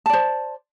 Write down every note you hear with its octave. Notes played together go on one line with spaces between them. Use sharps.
C5 D5 A5